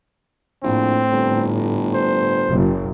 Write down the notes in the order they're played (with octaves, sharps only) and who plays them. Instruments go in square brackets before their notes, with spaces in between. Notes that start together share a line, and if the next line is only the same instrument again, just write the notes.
[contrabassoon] A#1 [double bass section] A2 [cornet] C4
[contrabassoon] G1
[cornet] C5
[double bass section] F#1